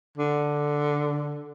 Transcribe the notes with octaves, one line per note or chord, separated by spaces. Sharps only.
D3